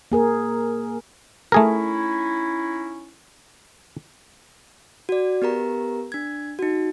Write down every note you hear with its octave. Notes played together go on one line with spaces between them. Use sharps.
A#3 G#4 A#4
A3 C#4 D#4 E4 G#4 A#4
F#4 D5
B3 G4 A#4 A#5
D4 G#6
D#4 F#4